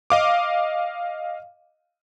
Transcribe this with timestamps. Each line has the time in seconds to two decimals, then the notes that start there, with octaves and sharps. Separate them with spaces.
0.10 D#5 F5 D6